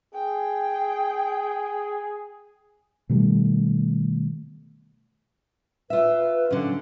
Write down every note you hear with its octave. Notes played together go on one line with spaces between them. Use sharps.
G#4 G5
B2 D#3 G3 A3
F4 B4 E5
D3 F#3 C#4